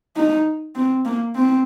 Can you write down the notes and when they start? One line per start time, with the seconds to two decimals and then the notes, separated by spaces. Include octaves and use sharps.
0.16 D#4
0.75 C4
1.05 A#3
1.35 C4